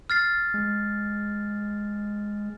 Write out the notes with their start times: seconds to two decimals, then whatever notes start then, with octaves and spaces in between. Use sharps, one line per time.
0.10 F6 A6 C7
0.54 G#3